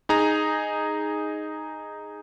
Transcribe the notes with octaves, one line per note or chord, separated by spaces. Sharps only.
D#4 G#4 A#5